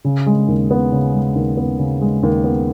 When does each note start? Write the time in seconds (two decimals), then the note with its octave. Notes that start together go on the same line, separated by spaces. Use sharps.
0.05 C#3
0.26 G#3
0.48 D#2
0.71 B3
0.92 C#3
1.14 G#3
1.36 D#2
1.57 B3
1.79 C#3
2.01 G#3
2.23 D#2
2.44 B3